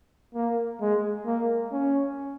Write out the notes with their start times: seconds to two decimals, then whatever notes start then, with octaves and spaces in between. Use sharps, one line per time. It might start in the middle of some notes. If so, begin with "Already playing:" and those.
0.34 A#3
0.81 G#3
1.26 A#3
1.72 C#4